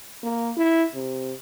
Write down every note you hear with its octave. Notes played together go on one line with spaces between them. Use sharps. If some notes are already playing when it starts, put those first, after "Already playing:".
A#3
E4
C3